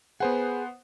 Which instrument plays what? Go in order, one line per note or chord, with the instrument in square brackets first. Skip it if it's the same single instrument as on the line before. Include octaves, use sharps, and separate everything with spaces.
[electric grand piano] B3 C5 F#5 [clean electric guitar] G#4 B4